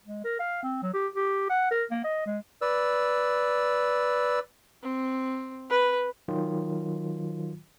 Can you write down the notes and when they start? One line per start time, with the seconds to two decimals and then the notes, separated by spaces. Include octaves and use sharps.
0.05 G#3
0.24 A#4
0.39 F5
0.63 C4
0.82 F#3
0.94 G4
1.16 G4
1.49 F#5
1.71 A#4
1.91 A#3
2.04 D#5
2.26 G#3
2.62 B4 D5 E6
4.83 C4
5.70 B4
6.28 D#3 F#3 F4